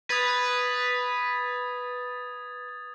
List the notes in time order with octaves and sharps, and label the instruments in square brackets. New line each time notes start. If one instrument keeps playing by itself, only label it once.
[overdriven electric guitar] B4 [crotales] D#6 G#6 A6